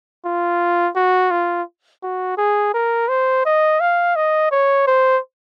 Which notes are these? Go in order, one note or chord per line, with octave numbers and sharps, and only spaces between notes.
F4
F#4
F4
F#4
G#4
A#4
C5
D#5
F5
D#5
C#5
C5